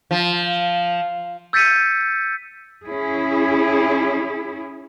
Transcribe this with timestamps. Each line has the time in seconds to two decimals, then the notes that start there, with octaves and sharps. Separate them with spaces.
0.11 F3
1.53 E6 G6 A6 B6 C#7 D#7
2.84 C#4 E4 G#4